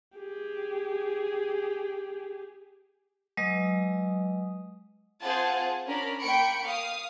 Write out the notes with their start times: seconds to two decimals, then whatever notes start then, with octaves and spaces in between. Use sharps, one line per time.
0.17 G4 G#4
3.37 F#3 G#3 B4 D#5 D#6
5.21 C4 F4 G#4 C5 F#5 A5
5.86 C#4 D4 A#4 B5
6.20 A#3 G5 B5 C#6 C#7 D7
6.67 F5 D#6